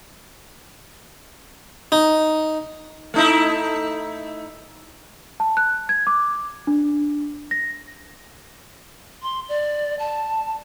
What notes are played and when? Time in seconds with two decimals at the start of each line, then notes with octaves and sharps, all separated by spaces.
1.92 D#4
3.14 A3 D#4 E4
5.40 A5
5.57 F#6
5.89 G#6
6.07 D6
6.67 D4
7.51 A#6
9.22 C6
9.49 D5
9.99 A5